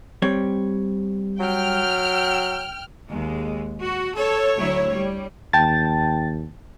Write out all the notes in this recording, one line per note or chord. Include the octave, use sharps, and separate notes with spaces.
G3 C4 C#5
F#3 G5 F6
D#2 G#3
F#4
A4 C#5
D2 F#3 E4
G3
D#2 G5 A5 A6